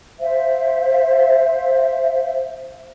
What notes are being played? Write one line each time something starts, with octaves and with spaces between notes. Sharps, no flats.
C5 E5 F5